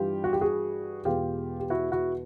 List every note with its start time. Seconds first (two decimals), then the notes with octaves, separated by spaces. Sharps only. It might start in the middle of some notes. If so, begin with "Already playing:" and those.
Already playing: G2 E3 G3 F4 G4
0.24 F#4
0.33 G4
0.41 F#4 G#4
1.05 E2 B2 G#3 F4 G4
1.60 G4
1.70 E4 F#4
1.92 E4 F#4